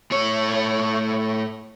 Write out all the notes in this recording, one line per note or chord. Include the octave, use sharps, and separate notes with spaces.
A2 C#5